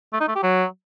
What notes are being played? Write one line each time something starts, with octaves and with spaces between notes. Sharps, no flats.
A3
D#4
A3
G4
F#3